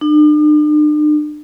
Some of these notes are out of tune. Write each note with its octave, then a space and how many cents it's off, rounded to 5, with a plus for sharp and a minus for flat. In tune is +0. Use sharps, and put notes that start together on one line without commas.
D4 +45